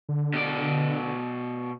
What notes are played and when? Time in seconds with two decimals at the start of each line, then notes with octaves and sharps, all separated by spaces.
0.09 D3
0.34 B2 D5